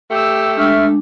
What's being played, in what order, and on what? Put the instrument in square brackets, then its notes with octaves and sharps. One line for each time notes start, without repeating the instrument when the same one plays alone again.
[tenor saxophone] A3 [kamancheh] G4 E6
[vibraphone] G#3 D4 [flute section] E5 C#6 F6